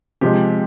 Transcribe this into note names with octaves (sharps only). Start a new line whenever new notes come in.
C3 F3 G#3 G4